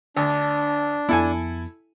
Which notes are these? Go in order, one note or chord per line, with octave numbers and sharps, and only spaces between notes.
D2 D4
F2 B3 E4 A4 G#5